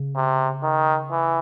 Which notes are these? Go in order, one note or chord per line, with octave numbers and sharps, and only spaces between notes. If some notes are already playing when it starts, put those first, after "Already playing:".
Already playing: C#3
C3
D#3
E3